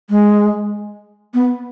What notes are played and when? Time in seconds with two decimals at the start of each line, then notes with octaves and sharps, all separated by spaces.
0.10 G#3
1.34 B3